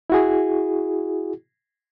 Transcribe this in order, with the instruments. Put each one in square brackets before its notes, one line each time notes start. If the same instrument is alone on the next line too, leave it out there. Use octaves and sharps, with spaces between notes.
[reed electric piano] E4 F#4 G#4